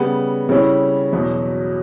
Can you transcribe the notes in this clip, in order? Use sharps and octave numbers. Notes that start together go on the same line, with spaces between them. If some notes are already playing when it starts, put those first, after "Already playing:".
Already playing: C#3 G3 B3
C#3 G3 C#4 E4
E2 B2 F#3